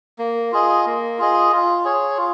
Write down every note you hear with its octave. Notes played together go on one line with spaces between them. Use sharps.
A#3
F4 G#4 D#5
A#3
F4 G#4 D#5
F4
G#4 C#5
F4